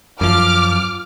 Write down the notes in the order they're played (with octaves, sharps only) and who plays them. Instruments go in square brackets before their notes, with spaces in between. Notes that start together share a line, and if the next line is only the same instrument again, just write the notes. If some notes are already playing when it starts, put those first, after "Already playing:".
[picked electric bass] F#2 F3 [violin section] D6 F6